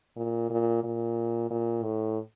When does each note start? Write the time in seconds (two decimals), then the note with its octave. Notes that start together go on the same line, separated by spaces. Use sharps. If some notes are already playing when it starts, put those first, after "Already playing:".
0.17 A#2
0.50 A#2
0.84 A#2
1.51 A#2
1.84 A2